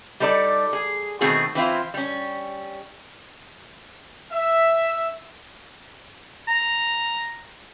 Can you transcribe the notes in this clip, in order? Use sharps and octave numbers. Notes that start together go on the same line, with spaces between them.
G3 D#4 A4 A#4 D5
G#4
B2 D#3 A3 C4 F#4 G#4
E3 C4 E4 F4
G3 C#4
E5
A#5